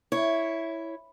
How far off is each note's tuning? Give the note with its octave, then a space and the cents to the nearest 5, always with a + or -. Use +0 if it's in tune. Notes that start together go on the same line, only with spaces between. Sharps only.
E4 +0 C#5 +0